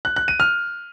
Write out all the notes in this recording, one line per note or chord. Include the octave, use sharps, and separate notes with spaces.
F#6
F#6
D#7
F6